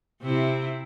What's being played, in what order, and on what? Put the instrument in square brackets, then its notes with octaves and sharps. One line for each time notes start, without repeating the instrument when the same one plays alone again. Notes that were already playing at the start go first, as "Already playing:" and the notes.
[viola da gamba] C3 C4 E4